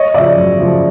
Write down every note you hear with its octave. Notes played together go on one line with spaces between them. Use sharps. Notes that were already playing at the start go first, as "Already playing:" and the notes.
Already playing: C#5 D#5
C#3 F3 D5 E5
F#2
C#3 F3